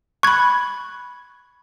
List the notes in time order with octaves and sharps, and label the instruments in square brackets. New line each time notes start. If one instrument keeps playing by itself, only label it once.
[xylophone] B5 F#6 [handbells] C#6 G#6